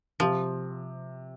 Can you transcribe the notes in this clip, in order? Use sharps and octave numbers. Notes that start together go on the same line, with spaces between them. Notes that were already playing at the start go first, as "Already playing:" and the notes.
C3 F3